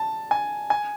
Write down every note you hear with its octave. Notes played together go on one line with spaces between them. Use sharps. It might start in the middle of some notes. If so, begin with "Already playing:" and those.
Already playing: A5
G#5
G#5